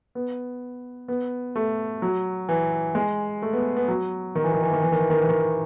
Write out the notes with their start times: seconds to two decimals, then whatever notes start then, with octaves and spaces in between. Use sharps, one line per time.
0.15 B3
1.08 B3
1.56 A3
2.02 F#3
2.49 E3
2.95 G#3
3.42 A3
3.53 B3
3.77 B3
3.88 F#3
4.35 D#3
4.44 E3
4.54 D#3
4.63 E3
4.73 D#3
4.82 E3
4.92 D#3
5.00 E3
5.10 D#3
5.20 E3
5.29 D#3